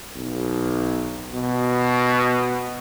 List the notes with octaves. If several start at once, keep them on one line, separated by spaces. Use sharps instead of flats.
B1
B2